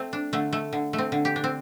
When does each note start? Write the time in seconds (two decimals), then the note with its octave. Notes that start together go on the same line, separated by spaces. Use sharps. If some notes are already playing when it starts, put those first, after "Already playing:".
Already playing: A3 C4
0.13 D4
0.33 D3 A3
0.53 A3
0.73 D3
0.93 A3
0.98 C4
1.12 D3
1.25 G4
1.36 D4
1.44 C4